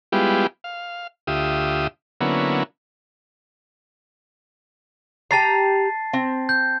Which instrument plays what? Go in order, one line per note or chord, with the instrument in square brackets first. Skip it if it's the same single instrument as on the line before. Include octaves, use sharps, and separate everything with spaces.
[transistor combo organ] G3 G#3 B3 E4 F4 G4
F5
D2 F4 G4 E5 D#6
D3 F#3 A#3 B3 C#4 E4
[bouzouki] G4 A#5 [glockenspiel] A5 A6 C7
[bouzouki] C4
[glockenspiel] G6